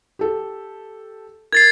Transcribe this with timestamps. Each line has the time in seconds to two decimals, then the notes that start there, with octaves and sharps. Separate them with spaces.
0.19 G4 A4
1.53 A#4 G#6 A6 C7